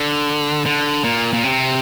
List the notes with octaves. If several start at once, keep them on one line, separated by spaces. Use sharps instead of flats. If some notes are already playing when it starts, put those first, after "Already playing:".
Already playing: D3
D3
A#2
A#2
C3